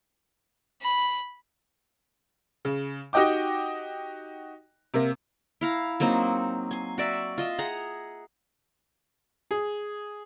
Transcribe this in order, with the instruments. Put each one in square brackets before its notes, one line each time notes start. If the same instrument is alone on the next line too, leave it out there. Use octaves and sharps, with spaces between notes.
[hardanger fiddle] B5
[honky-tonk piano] C#3
D#4 F#4 G4 D#5 G5 D6
C3 A#3
[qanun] E4 F5 A#5
F#3 A#3 C4 D#4
G#5 C6
F#4 D5 E5
F4 D#5 E5
G#4 F#5 A#5
[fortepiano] G#4